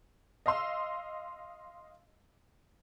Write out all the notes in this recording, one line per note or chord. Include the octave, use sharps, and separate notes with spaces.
D#5 F5 C6 E6